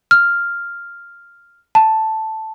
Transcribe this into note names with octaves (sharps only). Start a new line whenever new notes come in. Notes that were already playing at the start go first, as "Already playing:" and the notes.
F6
A5